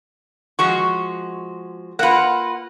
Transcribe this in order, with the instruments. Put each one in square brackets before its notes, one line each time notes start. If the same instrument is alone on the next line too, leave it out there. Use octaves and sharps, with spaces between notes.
[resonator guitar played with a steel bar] F3 G#3 F#4 [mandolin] C#6
[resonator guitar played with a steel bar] A#3 F4 [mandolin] B4 F#5